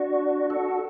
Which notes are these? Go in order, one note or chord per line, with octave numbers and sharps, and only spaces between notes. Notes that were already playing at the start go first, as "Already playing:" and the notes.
Already playing: D4 F#4
F#4 A4